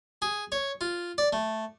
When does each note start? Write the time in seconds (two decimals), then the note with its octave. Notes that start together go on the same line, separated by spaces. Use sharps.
0.22 G#4
0.52 C#5
0.81 F4
1.18 D5
1.33 A3